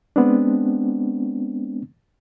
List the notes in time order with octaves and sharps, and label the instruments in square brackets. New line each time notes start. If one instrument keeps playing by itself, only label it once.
[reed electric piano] G#3 B3 C4 D4